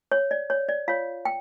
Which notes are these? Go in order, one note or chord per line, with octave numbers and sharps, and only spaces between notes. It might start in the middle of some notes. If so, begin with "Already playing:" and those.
C#5
D5
C#5
D5
F4 C#5 F5
G5